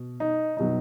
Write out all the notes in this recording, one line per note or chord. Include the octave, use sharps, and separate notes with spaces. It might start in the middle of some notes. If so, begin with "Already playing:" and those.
Already playing: B2
D#4
B2 F#3 D#4